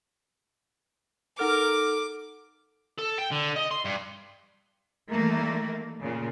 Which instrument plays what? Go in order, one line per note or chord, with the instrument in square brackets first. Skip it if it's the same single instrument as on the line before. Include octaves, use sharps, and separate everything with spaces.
[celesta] D#4 F#5 F6 [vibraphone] A4 [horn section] A#4 [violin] D6
[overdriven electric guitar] A4
G5
D3
D#5
C6
G2
[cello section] D#3 E3 G3 A3 A#3 A#4
A#2 C#3